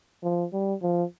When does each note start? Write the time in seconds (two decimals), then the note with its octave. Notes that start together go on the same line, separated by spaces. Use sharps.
0.23 F3
0.53 G3
0.83 F3